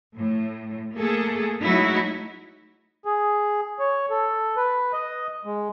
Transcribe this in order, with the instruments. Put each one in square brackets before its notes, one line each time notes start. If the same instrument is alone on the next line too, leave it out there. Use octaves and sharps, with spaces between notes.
[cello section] A2
A3 A#3 G#4 A4
F#3 G#3 A3 D#4 E4 F#4
[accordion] G#4
C#5
A4
B4
D#5
G#3